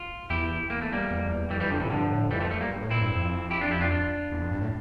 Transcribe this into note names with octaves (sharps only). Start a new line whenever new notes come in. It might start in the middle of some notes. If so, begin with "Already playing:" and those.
Already playing: F4
E2 E4 G4
E2 A#3
A3
G3 A#3
E2
F2
E2
F2 E3 G3
E3 G3
D3 F3
C3 E3
A2
G2 D3 F3
A2
F2 E3 G3
F3 A3
F3 A3
G3 A#3
G2
A2
A#2 C4 E4
G2
F2
E4 G4
D4 F4
E4 G4
D4 F4
D4 F4
E2
F2
G2
A2